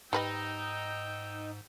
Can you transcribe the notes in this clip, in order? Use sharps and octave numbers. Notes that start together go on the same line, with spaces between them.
G#2 G3 D#4 B4 D#5 G5 E6